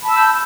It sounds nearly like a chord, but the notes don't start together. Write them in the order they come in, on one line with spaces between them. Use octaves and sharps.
B5 A5 E6 G6